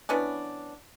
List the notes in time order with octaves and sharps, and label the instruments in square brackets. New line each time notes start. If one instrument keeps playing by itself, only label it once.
[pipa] E3 B3 C#4 D4